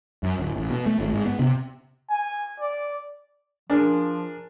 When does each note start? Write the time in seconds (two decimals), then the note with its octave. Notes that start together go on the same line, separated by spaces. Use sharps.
0.23 F#2
0.39 D1
0.57 A1
0.70 B2
0.86 A3
0.99 G#1
1.14 G#2
1.26 B3
1.39 C3
2.09 G#5
2.60 D5
3.70 F3 D4 G#4 A#4